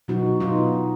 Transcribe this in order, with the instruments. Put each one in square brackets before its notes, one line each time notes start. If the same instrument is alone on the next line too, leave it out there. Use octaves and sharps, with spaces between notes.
[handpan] B2 F#3 B3 D#4 F#4
B2 F#3 B3 D#4 F4